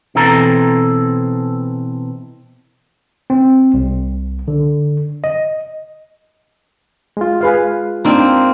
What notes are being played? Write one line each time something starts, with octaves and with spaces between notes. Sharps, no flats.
B2 E3 C4 A4 A#5
C4
C2
D3
D#5
G#3 F4
G#4 B4 F5
A#3 C4 D4 D#4 A5